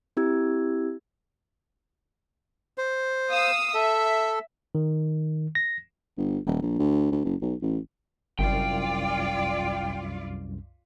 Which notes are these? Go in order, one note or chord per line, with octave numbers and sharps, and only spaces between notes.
C4 E4 G4 E6 G#6
C5
F5 D#6 E6
A4 E5
D#3
A#6
G1
D#1
A#1
D2
D2
F#1
B1
A1
G1 C2 F#2 F4 D5 G5